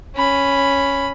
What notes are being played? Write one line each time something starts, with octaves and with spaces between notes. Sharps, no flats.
C#4 B5